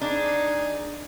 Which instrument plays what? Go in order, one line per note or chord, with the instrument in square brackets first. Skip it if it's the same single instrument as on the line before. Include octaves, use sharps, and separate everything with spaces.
[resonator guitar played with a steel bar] D4 [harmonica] D#4 G#4